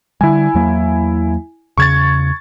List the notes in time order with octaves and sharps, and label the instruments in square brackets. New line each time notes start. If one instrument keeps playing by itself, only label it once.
[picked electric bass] D3 G3 [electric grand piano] E4 G#5
[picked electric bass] E2 F#3 A#3
[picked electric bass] E2 C#3 [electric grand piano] C#6 G#6 A6